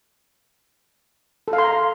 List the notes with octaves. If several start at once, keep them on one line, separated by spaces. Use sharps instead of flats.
A4
F5
C6
A#5